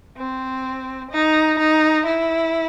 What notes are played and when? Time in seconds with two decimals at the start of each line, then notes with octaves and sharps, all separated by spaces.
0.17 C4
1.11 D#4
1.59 D#4
2.06 E4